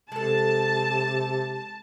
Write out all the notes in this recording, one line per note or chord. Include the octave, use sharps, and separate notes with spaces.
C3 G#3 A4 A5